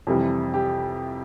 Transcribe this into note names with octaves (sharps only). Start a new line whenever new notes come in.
F2 C3 E3 G3
G4